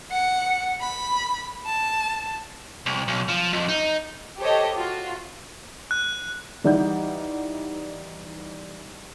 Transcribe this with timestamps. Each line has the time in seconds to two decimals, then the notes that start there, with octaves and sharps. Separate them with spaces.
0.10 F#5 C#7
0.80 B5
1.66 A5
2.86 C2
3.08 B1
3.29 F3
3.53 F2
3.69 D#4
4.40 G4 A4 C5 C#5 D#5
4.77 F4 F#4
5.91 F#6
6.64 E3 G3 D#4 D5 F#5 G6